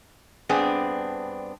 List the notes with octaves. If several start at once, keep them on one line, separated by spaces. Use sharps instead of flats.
G2 B3 C4 D4 G#4